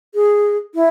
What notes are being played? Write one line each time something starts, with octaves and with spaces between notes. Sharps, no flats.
G#4
E4